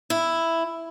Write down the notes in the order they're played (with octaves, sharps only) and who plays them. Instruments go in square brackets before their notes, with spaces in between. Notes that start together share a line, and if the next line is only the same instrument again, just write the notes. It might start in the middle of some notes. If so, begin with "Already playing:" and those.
[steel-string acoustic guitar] E4